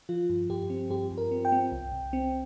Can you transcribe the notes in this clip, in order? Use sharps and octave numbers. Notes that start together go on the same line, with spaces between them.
F3 F4
G2
G2 G4
C4
G2 G4
G2
A#4
C4
G5
C4
C2
C2
C4